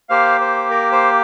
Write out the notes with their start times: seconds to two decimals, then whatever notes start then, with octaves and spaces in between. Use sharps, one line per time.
0.09 A#3 G4 C5 F5
0.40 C5
0.71 A#4
0.92 C5